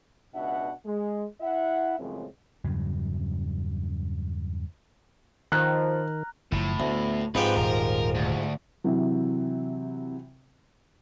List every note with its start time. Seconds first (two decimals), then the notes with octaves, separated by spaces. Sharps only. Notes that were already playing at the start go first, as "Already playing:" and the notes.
0.35 C#2 B2 D4 E5 F#5
0.85 G#3
1.41 E4 E5 F#5
1.99 F#2 A2 C#3 F3 G#3 C4
2.64 E2 G2 C#3 F#3
5.52 D#3 F3 A#5 F6 F#6
6.52 F#1 A2 F3
6.80 D2 B3
7.35 G#2 F3 C4 G4 B4
7.57 D#1 A#4
8.15 D2
8.84 C3 E3 F#3